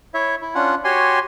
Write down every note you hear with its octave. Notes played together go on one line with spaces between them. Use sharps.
E4 C#5 E5
E4
C#4 D4 F4 F#5
F#4 G4 C#5 G#5 C6